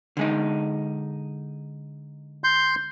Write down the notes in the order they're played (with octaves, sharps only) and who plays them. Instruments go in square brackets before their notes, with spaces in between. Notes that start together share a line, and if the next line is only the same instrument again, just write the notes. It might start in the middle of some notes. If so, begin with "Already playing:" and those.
[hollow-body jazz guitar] D3 G#3 D#4
[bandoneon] C6 G6